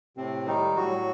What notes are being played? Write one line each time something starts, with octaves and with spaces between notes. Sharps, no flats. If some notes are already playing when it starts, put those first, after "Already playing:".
A2 C3 C4
D#3 G3 D#4
A2 F#3 F#4